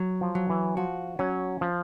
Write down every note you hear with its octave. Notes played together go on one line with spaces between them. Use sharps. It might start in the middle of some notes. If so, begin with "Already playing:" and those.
Already playing: F#3
F3
F#3
E3
F3 F#4
F#3 C#4
F3